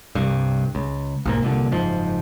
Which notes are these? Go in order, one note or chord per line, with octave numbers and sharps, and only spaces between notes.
C2 G2
C#2
B1 G#2 A#3
C2 A#2 D3
F#1 G#2 F3